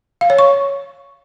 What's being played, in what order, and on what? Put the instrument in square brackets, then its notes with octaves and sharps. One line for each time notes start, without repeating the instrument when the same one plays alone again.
[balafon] F5
C#5
C#6